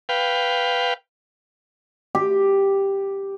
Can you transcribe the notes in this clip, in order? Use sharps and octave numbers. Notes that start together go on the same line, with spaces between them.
B4 F5 G5
G4